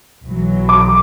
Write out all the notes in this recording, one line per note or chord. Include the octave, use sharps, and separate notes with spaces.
B1 E3 F#3
D6